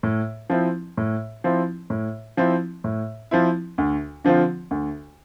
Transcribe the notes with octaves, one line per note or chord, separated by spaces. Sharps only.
A2
F3 C4 E4
A2
F3 C4 E4
A2
F3 C4 E4
A2
F3 C4 E4
D2
D3 F3 C4 F4
D2